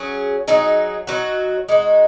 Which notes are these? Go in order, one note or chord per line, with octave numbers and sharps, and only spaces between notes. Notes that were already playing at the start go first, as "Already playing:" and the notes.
Already playing: F#3 C#4 G#4
F#3 D#4 G#4
F#3 D#4 F#4
G#3 D#4 F#4